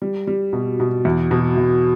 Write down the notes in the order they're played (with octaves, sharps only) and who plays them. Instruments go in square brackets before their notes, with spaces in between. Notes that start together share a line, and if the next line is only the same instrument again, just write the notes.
[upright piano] G3
G3
B2
B2
E2
B2
E2